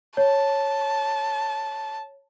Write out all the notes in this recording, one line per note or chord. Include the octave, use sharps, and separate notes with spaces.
C#5 A5